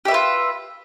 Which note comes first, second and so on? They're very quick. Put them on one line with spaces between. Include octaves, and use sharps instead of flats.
G4 E5 B4 F4